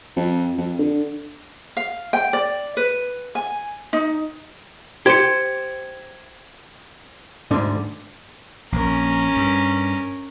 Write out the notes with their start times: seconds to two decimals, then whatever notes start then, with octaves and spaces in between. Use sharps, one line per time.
0.16 F2
0.58 F2
0.79 D3
1.77 F5
2.13 G5
2.33 D5
2.77 B4
3.35 G#5
3.93 D#4
5.06 G4 C5 G#6 C#7
7.51 D2 G#2 D3
8.72 A#1 C#4 A#4
9.37 G2